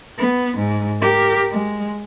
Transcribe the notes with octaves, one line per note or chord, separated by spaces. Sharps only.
B3
G#2
G4 A#4
G#3